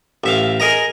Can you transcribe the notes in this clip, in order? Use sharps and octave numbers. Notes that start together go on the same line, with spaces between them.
A1 E5 F5
G#4 A#4 D#5 A#5